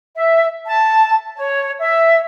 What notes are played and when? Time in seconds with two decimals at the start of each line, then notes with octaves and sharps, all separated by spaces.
0.15 E5
0.66 A5
1.37 C#5
1.79 E5